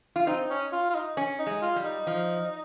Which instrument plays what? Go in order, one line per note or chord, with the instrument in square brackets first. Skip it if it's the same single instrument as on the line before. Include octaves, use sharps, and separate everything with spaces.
[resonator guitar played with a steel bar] F4
[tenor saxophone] C4 [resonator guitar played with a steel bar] D#4
[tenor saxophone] C#4
F4
F4
D#4
[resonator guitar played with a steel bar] C#4
[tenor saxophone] D#4
[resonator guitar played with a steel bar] G#3
[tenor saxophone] F4
[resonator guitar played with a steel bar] G3
[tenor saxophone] D#4
[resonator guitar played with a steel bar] F3